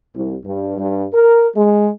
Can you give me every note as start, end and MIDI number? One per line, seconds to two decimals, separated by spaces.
0.15 0.36 36
0.45 0.75 43
0.78 1.05 43
1.13 1.48 70
1.56 1.89 56